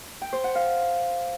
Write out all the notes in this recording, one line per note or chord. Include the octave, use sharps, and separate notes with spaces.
G5
C5
F#5
F5